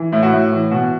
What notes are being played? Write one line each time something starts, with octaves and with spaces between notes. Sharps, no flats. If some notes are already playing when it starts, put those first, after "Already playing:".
Already playing: E3
A2 E4
F#4
A2
E3
B2 F#4